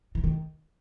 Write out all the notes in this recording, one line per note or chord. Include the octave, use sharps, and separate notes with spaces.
E3
D#3